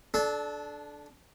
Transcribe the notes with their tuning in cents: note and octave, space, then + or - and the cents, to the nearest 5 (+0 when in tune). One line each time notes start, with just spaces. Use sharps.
D4 +0 A4 -25